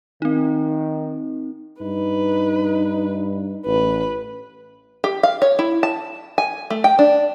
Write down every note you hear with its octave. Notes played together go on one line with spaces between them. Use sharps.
D#3 C4 D#4
G2 D#4 B4
A1 B4
G4
F5
C#5
E4
A5
G#5
A3
G5
D4